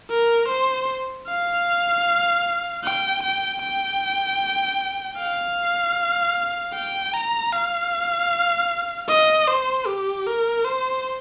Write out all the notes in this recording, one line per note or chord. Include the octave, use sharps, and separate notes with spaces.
A#4
C5
F5
G5
G5
G5
F5
G5
A#5
F5
D#5
C5
G4
A#4
C5